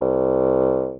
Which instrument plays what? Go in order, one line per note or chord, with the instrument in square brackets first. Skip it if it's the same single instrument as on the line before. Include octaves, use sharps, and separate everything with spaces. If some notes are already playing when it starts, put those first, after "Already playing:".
[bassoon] C2